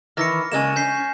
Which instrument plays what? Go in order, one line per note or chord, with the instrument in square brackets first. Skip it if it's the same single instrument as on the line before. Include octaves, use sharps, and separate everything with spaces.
[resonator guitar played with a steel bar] D#3 E3 [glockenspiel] F6 A#6 C#7
[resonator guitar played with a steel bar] C#3 G#3 A#3 [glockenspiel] G#5 E7
[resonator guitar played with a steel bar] C#4 [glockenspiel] G6 B6 C7